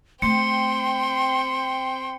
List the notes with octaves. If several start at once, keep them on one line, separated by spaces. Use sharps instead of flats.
A3 C4 G5 C6 C#7